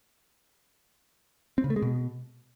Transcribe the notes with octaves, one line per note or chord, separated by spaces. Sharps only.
C4
C#3
A3
G#3
B2